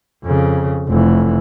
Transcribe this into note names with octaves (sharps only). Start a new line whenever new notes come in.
F2 C#3
F1 E3